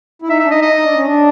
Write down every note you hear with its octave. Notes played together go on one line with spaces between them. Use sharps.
E4
D#4 E5
E5
D4
D#4 D#5
D#5
D#4
D4
C#4
D4